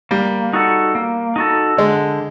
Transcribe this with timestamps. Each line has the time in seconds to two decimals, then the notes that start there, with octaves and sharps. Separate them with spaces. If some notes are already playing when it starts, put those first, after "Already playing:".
0.11 G3 A#3
0.53 D#4 F#4 A4
0.95 A#3
1.36 D#4 F#4 A4
1.77 D3 G#3